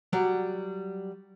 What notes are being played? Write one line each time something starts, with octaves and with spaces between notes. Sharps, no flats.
F#3 G3 D5